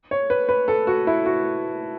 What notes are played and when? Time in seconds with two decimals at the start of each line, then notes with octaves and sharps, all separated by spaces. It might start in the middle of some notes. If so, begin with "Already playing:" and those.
0.11 C#5
0.30 B4
0.49 B4
0.68 A4
0.87 F#4
1.07 E4
1.26 F#4